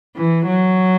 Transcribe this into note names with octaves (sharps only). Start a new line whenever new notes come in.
E3
F#3